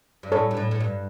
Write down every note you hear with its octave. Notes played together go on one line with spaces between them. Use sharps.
G2
A2 A4 C#5
G2
A2
A2
G2